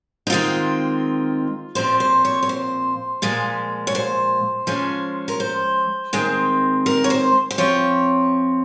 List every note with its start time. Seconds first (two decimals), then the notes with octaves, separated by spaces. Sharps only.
0.27 D#4
0.30 D#3 G#3 C4 F4
1.75 A#2 F3 C4 C5
2.00 C5
2.25 C#5
2.43 C#5
2.49 C5
3.22 A#2 F3 G#3
3.87 C#5
3.95 C5
4.67 F3 G#3 C#4
5.28 A#4
5.40 C5
6.13 D#3 G#3 C4
6.86 A#4
7.04 C#5
7.10 C5
7.51 C5
7.58 F3 C4 C#5